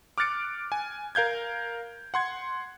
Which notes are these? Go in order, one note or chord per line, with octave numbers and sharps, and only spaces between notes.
D6 F6 F#6 A6 C#7 D7
G#5
A#4 F5 G6 G#6
F#5 C6 G#6